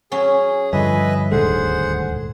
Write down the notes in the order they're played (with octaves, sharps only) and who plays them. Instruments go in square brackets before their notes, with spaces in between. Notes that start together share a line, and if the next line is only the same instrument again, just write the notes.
[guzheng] F#3 C#4 [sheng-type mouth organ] G#4
[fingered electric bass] G2 F3 [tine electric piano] D3 G#5 [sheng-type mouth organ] B4 D#5 E5
[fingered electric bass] D#1 D2 G#3 [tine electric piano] G#2 A4 [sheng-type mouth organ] G#4 C5 F#5